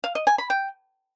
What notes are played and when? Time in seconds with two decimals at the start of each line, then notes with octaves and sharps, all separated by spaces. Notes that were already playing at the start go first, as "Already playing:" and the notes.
0.04 F5
0.15 D#5
0.27 G#5
0.38 B5
0.50 G5